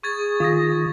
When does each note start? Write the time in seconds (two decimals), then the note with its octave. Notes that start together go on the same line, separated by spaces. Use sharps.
0.03 G#4 C#6 G#6 A6
0.40 D#3 F4 D#6 A#6